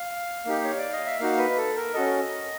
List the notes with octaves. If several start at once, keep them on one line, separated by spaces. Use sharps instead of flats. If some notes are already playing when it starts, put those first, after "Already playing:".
Already playing: F5
A#3 D#4 G4
C#5
D5
D#5
E5
A#3 D#4 F#4 F5
B4
A4
A#4
C#4 F#4 A4 D#5